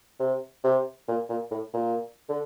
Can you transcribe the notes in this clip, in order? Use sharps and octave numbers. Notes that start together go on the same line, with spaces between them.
C3
C3
A#2
A#2
A2
A#2
D3